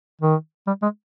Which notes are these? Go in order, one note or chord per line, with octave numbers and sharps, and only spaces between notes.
D#3
G3
G#3